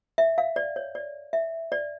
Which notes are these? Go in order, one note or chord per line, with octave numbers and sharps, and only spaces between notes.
E5
F5
D5
C#5
D5
E5
D5